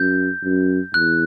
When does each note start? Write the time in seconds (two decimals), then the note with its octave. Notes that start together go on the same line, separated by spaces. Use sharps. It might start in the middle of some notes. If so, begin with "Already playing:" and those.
Already playing: F#2 G6
0.44 F#2
0.94 E2 F#6